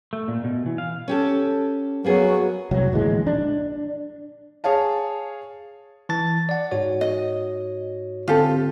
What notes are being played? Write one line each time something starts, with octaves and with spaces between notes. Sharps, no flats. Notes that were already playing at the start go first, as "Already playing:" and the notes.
A3
A#2
B2
E3
F5
C#4 G4 A4
F#3 A#3 B3 G#4
F1 C2 F#3
D1 A#1 E3 G#3
D4
G#4 C#5 F5 A5
E3 A5 A6
D5 F#5
G#2 F#4 C#5
D#5
D3 C4 F4 G4 A4